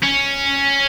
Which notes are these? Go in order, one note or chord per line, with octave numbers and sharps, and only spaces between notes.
C#4